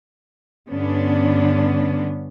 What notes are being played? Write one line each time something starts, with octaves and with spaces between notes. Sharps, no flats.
G2 D3 B3 C#4 D4